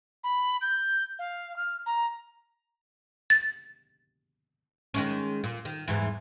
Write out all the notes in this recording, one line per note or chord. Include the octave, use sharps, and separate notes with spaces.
B5
G6
F5
F6
A#5
A6
D#3 G#3 C#4
A#2
D#3
E2 G#2 E3